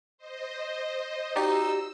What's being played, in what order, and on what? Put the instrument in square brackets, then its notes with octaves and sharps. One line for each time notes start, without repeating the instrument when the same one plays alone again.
[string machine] C5 D#5
[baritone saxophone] D#4 [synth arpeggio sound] F#4 G4 D5 [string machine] E6